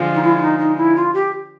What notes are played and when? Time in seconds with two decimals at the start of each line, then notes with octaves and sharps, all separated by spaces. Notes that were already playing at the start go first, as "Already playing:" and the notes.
Already playing: D3 F3 G#3
0.14 D#4
0.23 E4
0.37 E4
0.41 D#4
0.59 D#4
0.77 E4
0.96 F4
1.14 G4